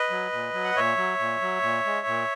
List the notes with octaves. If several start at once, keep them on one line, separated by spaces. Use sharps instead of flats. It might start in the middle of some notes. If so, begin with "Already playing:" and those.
Already playing: B4 D#5
F#3
A#2
F#3
F#5
A#2 C#5 E5
F#3
A#2
F#3
A#2
G#3
A#2